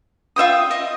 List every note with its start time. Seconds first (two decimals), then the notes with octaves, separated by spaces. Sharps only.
0.36 F4 E5 G5 D#6
0.71 D#5